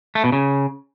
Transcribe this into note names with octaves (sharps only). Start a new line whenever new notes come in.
A3
B2
C#3